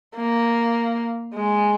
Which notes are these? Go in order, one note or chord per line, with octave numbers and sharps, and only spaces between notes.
A#3
G#3